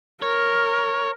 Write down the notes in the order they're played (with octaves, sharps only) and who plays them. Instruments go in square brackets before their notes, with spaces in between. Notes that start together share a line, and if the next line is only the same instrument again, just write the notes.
[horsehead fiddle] A#4 [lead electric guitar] C#5